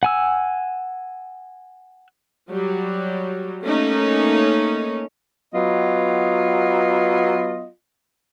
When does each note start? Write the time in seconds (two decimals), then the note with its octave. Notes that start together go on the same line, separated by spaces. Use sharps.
0.03 F#5 G#5 E6
2.50 F#3 G3
3.64 A3 A#3 C#4 D#4 C#5
5.53 F#3 B3 F4 D#5